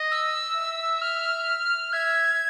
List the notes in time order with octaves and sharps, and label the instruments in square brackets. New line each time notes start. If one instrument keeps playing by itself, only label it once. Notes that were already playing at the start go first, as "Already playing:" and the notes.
Already playing: [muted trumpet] D#5
[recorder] E6
[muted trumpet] E5
[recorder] F6
[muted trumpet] E5 [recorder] G#6